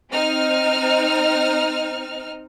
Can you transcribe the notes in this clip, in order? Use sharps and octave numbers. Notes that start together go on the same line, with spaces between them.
C4 D#4 F6